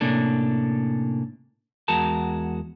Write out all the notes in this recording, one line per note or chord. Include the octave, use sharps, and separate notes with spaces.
A2 C3 A#3 C#4 D4 A4
E2 G#3 F#4 A#4 A5